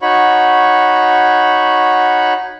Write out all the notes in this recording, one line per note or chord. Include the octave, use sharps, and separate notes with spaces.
D#4 F#4 C#5 B5 C#6